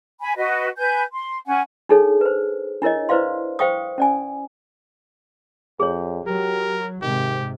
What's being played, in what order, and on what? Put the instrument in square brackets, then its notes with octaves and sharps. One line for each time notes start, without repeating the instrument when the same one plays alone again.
[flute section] G#5 B5
F#4 B4 D#5
B4 G#5 G6
C6
C#4 F#5 G#5
[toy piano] D4 D#4 G#4 A4 C#5
B4 C5
D4 E4 A#4 C#5 D#5
E4 B4 C5 D5 F5 C6
C5 F5 G5 C#6 D#6
C#4 D5 G#5
[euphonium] F2 [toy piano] G#4 C#5
[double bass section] F#3 [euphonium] G4 [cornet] A#4
[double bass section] G#2 C3 [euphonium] D#3 [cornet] G4